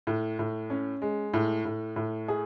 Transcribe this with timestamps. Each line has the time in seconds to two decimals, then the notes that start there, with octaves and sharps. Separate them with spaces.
0.07 A2
0.39 A2
0.70 C#4
1.02 G#3
1.34 A2
1.65 A2
1.96 A2
2.28 G#4